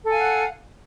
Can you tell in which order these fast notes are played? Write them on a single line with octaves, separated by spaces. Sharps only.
A4 G#5 F5 F#5